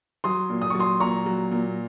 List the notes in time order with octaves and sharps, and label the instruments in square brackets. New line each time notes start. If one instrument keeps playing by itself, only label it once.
[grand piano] F#3 C6 D#6
A#2
D#6
C#6
F#3
C6 D#6
A#2 A#5 C#6
F#3
A#2